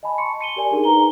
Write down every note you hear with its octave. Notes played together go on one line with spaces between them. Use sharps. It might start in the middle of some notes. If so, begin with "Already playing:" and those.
D#5 G#5 A5 B5
A5 C6 C#6 C#7
C#7 D#7 G7
G4 A#4 D5 G#5
D4 D#4 G#4 A#4 D5
D#4 B4 A#5 G7